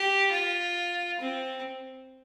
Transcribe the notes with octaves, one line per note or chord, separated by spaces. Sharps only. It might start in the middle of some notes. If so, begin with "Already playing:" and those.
Already playing: G4
F4
C4